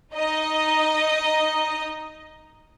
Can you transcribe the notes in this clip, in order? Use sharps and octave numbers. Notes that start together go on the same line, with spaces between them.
D#4 D#5